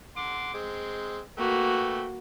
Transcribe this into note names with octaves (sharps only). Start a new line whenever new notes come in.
F#5 C6 D6
G#3 C4
A3 A#3 F#4 B4 G5